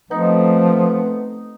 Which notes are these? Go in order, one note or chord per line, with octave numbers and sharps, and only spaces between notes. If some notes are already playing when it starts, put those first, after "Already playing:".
F3 A3 B3 C4 D#4